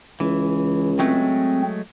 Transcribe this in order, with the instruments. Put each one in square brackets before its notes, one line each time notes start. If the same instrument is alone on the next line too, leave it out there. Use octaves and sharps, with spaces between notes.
[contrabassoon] C#2 [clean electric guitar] E3
[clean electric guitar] F#3 G#3 A3 [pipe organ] C4